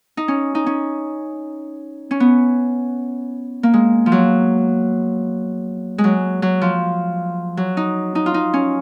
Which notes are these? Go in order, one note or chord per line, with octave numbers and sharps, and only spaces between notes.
D#4
C#4
D#4
C#4
C#4
B3
A#3
G#3
F3
F#3
G#3
F#3
F#3
F3
F#3
D#4
D#4
F4
D#4
C#4